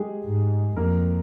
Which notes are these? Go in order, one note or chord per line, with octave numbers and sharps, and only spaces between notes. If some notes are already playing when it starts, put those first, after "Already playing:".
Already playing: G#3 G4 G#4
G#2
F2 A#3 A#4